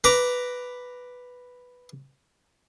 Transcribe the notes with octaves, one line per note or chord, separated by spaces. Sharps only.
B4 A#5 D6